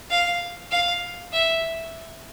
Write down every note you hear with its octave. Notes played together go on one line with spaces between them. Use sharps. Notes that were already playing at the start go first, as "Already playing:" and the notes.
F5
F5
E5